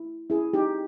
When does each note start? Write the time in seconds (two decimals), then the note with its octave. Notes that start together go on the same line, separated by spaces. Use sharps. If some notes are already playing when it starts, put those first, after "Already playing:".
Already playing: E4
0.30 E4 G#4
0.53 D#4 G4